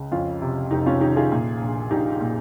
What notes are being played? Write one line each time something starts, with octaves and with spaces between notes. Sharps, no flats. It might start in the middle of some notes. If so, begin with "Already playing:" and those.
Already playing: C#2 C#3
F2 C#4 F4
C3
F1 D#4 G4
C#4 F4
D#3 D#4 G4
F4 G#4
A#2
A#1
A#1 D#4 G4
A#2